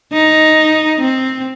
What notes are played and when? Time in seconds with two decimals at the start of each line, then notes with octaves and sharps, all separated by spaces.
0.13 D#4
1.01 C4